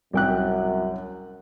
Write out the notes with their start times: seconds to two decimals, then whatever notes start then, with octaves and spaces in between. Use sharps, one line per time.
0.13 C2 F#2 G5 F#6